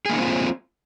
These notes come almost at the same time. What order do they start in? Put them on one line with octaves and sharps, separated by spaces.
G#4 A#3 D#4 C4 F4